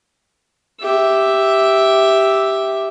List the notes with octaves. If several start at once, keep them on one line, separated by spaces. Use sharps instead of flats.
G4 E5